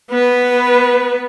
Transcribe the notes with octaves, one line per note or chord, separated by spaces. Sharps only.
B3 B4